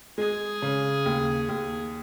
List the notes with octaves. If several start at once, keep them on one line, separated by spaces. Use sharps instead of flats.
G#3 G#4
C#3
D#2
D#2